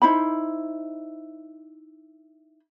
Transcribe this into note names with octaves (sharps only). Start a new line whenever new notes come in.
D#4 E4 C5 B5